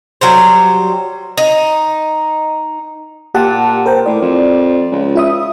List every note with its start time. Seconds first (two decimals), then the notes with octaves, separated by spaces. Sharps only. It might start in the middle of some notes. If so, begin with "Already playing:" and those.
0.21 F#3 G3 C5
1.37 D#4
3.35 A#2 G4 F#5 A5
3.86 A#4 C5 G5
4.06 A2 D5
4.21 F2
4.92 C#2
5.15 F4 E5 D#6